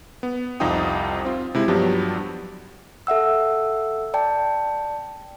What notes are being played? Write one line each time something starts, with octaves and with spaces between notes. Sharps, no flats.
B3
C2 F2 D#4 F4 G5 D#6
C4 F4
C3 G#3 E4
G2 F3 F#3 B3 D4 G4
A4 E5 F#5 E6
D5 G5 A5